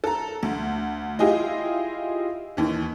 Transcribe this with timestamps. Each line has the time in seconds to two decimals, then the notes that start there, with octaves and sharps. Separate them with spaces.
0.04 A4 A#5
0.43 D2
1.19 E4 F4 G4 G#4 D#5
2.57 D#2 E3